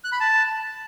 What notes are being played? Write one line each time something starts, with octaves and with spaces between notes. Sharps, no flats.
F#6
B5
A5